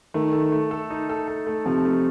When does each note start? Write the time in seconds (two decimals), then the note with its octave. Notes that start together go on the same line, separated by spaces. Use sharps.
0.14 D#3 A3
0.33 A4
0.52 A3
0.71 A4
0.90 D#4
1.09 A4
1.28 A4
1.47 A3
1.65 C3 F3
1.85 A3